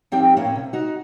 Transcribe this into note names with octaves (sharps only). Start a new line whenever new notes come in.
F3 C4 D#4 G4 G5
A2 A#3 C#4 E4
C3
D#4 F#4